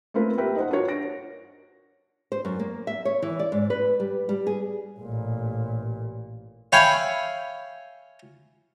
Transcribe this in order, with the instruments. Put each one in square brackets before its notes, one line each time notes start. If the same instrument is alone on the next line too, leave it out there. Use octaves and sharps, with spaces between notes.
[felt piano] A3 A#3 C4 F4 A#4 B4
G4 A#4 B4 E5 G5
D#4 C5 F#5
D4 F#4 A#4 C#5
A#6 D7
[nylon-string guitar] C5
F#2
A#3
E5
C#5
E3
D5
G#2
B4
G3
G3
G#4
[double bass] A1 A#2
[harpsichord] C#5 E5 F5 G5 G#5 B5